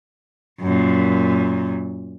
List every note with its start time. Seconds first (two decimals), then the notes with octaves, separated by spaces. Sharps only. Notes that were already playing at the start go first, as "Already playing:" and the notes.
0.61 F#2 A#2